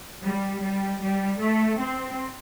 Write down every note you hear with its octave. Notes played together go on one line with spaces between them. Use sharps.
G3
G3
G3
A3
C4